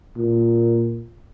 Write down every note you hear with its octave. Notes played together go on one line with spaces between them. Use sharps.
A#2